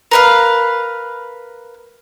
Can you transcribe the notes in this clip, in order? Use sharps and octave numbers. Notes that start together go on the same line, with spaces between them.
A#4 B4 F5